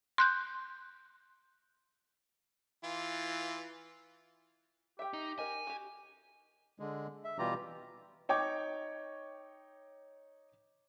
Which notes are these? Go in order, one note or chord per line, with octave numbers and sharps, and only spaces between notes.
C6 F#6 G6
E3 F4
G4 E5 G5
D#4
A#4 D#5 G#5
F#4 G4
D3 G#3
E5
B2 E3 G3 F4 G4 A#5
D#4 C#5 G5 D6